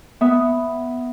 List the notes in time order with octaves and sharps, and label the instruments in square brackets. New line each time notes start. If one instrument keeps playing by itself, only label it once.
[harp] B3 E5 D#6